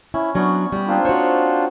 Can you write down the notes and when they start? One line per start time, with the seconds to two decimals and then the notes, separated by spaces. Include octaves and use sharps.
0.14 C#4 E4
0.35 F#3 B3 C#4 D4 C#6
0.72 G3 G4
0.88 A#3 C4 D4 D#4 F4
1.05 F#4 C5 C#5